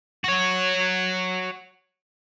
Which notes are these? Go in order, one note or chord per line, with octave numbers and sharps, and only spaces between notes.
F#4 C#5